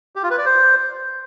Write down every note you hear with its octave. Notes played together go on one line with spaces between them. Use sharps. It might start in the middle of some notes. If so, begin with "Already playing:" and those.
G4
F4
B4
D5
C5